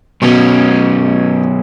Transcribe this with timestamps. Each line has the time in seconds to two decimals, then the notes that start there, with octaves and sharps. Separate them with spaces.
0.22 B1 B2 C#4